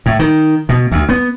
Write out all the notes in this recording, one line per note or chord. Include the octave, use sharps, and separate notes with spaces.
A2
D#3
B2
D2
B3